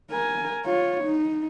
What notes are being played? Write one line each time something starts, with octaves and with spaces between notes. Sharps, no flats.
A#4 G#5
F4 C#5
D#4